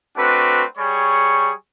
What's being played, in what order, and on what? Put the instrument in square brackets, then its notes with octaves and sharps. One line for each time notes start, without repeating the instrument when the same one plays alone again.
[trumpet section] A3 C4 D4 F#4 B4
G3 G#4 C#5 C#6